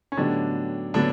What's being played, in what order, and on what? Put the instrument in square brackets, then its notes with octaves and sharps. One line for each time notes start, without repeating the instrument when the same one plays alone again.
[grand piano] C#4
[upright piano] A2 F#3 B3 D#4 G4 [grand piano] D3 D4
[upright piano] A2 F#3 B3 [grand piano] D3 D4